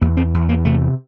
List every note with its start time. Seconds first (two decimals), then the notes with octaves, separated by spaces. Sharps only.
0.01 E2 A#3
0.17 C4
0.34 E2
0.49 A#3
0.65 C3 A3